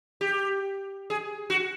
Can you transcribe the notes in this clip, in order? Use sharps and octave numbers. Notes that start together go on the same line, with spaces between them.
G4
G#4
F#4